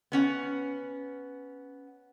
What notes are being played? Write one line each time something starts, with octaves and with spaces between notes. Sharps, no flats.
B3 C#4 F#5